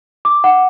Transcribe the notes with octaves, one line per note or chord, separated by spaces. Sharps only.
D6
F#5